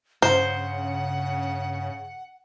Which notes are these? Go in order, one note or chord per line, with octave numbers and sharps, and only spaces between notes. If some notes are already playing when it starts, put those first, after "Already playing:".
G2 C#3 C5 F#5